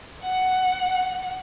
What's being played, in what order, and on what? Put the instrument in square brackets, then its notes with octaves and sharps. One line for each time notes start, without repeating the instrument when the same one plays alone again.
[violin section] F#5